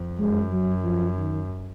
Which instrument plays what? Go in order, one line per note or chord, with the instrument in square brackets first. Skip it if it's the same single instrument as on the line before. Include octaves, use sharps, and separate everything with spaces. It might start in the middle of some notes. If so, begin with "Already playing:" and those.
Already playing: [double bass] F2
[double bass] F#2 [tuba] G#3
[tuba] F#3
F3
D#3